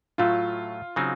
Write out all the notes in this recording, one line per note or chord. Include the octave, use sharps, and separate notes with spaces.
A2 F#3 A3 F4
C#3 F#3 C4 D#4